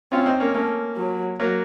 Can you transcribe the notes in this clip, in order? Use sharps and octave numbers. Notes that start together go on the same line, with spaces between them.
C4 C#4 F4
C4 D#4
A#3 C#4
A3 A#3 C#4
F#3
F#3 A#3